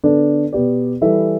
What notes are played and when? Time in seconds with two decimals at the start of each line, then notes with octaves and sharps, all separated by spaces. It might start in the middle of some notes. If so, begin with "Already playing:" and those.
0.04 D3 B3 D4 A4
0.53 B2 B3 G4 D5
1.02 E3 G3 E4 A4 E5